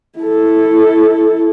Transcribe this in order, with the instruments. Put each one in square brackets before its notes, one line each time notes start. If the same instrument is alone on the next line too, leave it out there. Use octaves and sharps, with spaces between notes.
[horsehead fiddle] E4 A4